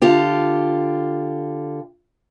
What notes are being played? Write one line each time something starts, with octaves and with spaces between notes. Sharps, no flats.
D3 F4 G4